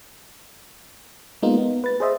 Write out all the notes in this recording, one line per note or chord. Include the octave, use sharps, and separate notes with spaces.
G#3 A#3 B3 D#4 F4
B3
B4 A6
G#4 C5 D#5 E5